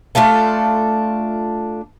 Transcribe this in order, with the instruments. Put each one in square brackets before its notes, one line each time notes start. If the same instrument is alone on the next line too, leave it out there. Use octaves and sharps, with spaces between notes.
[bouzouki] A3 D4 F4 A4